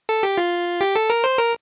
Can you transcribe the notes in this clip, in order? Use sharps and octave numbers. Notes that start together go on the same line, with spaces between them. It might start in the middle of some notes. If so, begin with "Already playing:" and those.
A4
G4
F4
G4
A4
A#4
C5
A#4